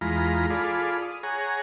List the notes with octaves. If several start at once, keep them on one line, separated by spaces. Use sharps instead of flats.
E2 G#3 F4 A#5 B5
F4 G#4 A4 D5 B5
D#6
G#4 C#5 F#5 G#5 A#5